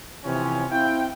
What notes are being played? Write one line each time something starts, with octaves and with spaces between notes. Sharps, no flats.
C3 E3 F3 C#4
C4 E4 F5 G5